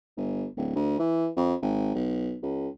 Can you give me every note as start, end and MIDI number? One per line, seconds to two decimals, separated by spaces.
0.17 0.45 31
0.57 0.73 26
0.75 0.98 38
0.99 1.28 52
1.37 1.54 41
1.62 1.94 32
1.95 2.36 35
2.43 2.68 37